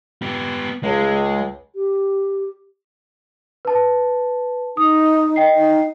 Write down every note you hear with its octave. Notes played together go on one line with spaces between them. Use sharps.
B3 G4
C#2 G#3
G4
B4 A5
D#4 D#6
D#5 G5 C7
D#4